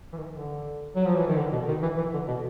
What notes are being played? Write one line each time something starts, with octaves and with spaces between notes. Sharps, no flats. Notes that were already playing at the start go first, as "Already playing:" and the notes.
E3
D#3
D3
F#3
F3
E3
D#3
D3
B2
D#3
E3
E3
D3
B2